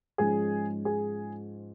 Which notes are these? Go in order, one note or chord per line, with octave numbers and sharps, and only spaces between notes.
G#2 F3 G#3 C#4 G#4
G#4